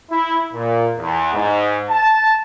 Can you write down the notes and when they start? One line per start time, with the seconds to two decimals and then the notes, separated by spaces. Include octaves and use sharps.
0.10 E4
0.53 A#2
0.97 E2
1.34 G#2
1.89 A5